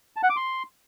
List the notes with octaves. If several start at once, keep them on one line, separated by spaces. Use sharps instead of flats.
A5
F#5
D6
C6